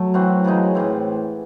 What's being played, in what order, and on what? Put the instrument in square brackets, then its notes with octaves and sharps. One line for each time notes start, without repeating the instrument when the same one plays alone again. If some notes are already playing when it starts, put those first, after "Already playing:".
Already playing: [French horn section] F#3 [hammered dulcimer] A3
[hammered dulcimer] E3 C4 F#4
C#3 E3 G#3 D#4
A2 E3 C4